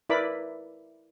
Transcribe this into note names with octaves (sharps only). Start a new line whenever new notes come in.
E4 A#4 B4 D5 B5 D6